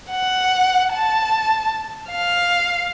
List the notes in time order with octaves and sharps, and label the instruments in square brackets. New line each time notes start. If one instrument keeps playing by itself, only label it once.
[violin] F#5
A5
F5